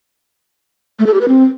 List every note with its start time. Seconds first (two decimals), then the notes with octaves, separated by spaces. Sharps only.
0.99 A3
1.06 A4
1.14 G4
1.21 B4
1.28 C4